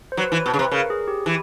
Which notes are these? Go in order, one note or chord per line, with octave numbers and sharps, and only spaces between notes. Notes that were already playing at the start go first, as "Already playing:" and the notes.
C5
F#3 B4
E3 B4
B2
C#3
C3 B4
C#3 A#4
G#4
G4
E3